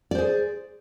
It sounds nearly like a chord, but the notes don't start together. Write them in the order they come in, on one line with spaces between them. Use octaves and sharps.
D5 C5 G#4